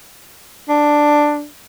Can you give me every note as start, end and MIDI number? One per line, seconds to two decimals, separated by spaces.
0.69 1.45 62